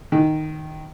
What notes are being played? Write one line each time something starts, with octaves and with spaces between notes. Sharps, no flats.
D#3